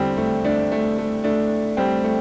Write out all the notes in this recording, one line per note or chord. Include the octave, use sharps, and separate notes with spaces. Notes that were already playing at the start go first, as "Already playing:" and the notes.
Already playing: E2 D3 G3 C4
A3
A3 D4
A3
A3
A3 D4
G3 C4
A3